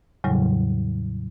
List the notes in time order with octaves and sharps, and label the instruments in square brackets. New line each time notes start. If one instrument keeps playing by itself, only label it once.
[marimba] E2 A2 C#3 F#3 G3